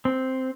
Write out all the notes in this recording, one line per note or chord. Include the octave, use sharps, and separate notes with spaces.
C4